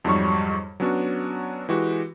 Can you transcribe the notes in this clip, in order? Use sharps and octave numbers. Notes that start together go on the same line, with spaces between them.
F2 G#2 F#3 G3 C#5 C#6
F#3 B3 C#4 D4 F#4
E3 G#3 F#4 G4